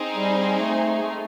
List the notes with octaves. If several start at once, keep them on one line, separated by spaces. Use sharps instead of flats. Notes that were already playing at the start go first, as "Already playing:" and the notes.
Already playing: C4 D#4 G#4
G3
A3
A3